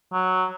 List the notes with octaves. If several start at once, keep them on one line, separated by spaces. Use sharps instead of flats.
F#3